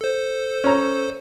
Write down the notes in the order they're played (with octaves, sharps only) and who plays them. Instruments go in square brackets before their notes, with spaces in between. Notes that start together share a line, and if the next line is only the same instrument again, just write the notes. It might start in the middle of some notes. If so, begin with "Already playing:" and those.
[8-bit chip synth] A4 C5
[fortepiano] C#4 A#5